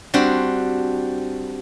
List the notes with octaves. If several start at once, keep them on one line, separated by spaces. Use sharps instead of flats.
G3 C4 D4 F#4